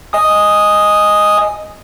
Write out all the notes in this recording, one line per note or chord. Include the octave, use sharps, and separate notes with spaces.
D#5 G#5 D#6